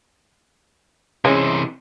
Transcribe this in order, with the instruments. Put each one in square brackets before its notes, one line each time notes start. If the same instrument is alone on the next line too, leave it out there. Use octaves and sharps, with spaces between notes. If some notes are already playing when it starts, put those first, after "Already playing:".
[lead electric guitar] C3 E3 [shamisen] G#3 C#4